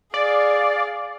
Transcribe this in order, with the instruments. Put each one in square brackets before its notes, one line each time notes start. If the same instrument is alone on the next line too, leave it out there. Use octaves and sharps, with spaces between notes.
[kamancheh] G#4 F5 [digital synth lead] D5